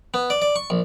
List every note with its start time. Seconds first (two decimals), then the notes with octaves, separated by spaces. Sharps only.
0.14 B3
0.30 D5
0.42 D5
0.56 C#6
0.70 A#1